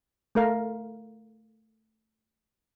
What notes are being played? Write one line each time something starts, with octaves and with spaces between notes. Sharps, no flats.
A3 A#4 F5